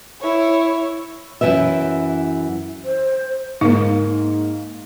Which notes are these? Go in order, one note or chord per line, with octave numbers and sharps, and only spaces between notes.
E4 C#5
F#2 B2 E3 B4 E5
C5
G#2 A#3 D#4